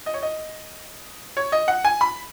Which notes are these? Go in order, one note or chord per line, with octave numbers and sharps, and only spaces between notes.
D#5
C#5
D#5
C#5
D#5
F#5
G#5
B5